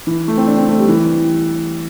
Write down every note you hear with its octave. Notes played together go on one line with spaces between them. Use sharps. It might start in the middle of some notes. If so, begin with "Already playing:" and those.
E3
A3
C4
D4
C4
A3
G3
E3